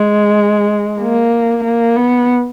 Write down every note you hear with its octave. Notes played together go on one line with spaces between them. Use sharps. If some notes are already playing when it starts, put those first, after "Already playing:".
Already playing: G#3
A#3
A#3
B3